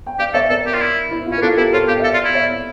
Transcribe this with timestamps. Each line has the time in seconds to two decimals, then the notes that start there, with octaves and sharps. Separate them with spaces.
0.06 G5
0.19 G4 D5 F5
0.34 A4 C#5 E5
0.50 A4 A#4 D5
0.66 G4
0.74 F4
0.81 E4
1.11 E4
1.27 F4
1.32 C#4
1.38 A#4
1.42 D4 F4 A4
1.57 E4 G4 A#4
1.73 F4 A4 C#5
1.88 G4 F5
2.00 A4 E5
2.12 F4 D5 F5
2.25 E4
2.34 C#5 E5